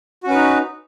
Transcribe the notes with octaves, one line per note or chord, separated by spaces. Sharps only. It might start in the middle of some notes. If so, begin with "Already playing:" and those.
C#4 D#4 F#4 B4